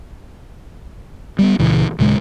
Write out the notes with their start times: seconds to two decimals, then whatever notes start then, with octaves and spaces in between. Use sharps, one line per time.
1.39 G3 A3 B3
1.59 C#2 A#2 C#3 E3
1.99 D#2 A#2 C#3 G#3